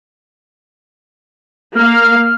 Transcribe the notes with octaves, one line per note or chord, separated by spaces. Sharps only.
A#3 F5 F6